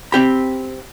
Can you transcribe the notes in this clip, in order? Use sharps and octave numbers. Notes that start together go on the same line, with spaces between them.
C4 G4 B5